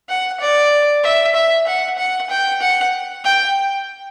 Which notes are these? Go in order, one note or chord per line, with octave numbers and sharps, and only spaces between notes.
F#5
D5
E5
E5
F#5
F#5
G5
F#5
G5